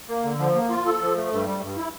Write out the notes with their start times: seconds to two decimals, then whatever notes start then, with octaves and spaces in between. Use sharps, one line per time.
0.09 A#3
0.24 D3
0.39 F3
0.55 A#3
0.70 F4
0.85 A4
1.01 F3
1.16 A3
1.31 G2
1.47 G3
1.62 G2
1.77 E4